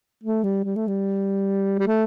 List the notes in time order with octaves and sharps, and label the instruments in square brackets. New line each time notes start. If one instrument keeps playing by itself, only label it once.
[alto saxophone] A3
G3
G3
A3
G3
G3
A3